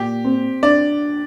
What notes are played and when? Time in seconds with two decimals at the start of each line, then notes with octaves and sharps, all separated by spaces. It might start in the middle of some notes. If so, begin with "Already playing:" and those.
Already playing: A#2 G4
0.24 C4
0.63 D4 D5